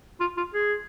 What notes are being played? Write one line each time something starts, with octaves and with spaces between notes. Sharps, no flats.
F4
F4
G#4